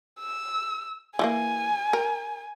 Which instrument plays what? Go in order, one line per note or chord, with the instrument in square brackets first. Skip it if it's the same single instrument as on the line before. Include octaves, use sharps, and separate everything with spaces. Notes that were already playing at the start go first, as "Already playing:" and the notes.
[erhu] E6
[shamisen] E3 A3 A#3 [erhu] G#5
[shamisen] A#4